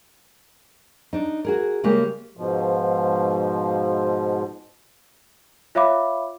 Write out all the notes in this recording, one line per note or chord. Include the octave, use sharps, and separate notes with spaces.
D4 D#4
F#4 G#4 A#4
C#3 G3 G#3 A#3 G4
G#2 B2 F3
F4 C#5 E5 F5 B5 D6